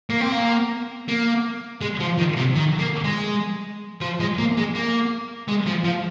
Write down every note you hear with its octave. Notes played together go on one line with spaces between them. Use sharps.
A#3
C4
A#3
A#3
G#3
F3
D#3
C3
D#3
A#3
G#3
F3
G#3
A#3
G#3
A#3
G#3
F3
F3